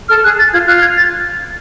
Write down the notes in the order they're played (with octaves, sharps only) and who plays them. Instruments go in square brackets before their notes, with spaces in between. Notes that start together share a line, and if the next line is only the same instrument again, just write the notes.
[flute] A4 [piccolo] F6
[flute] G#4 [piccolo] F#6
[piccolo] A6
[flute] F4 [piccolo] G#6
[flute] F4 [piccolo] F#6
[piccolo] G#6
A6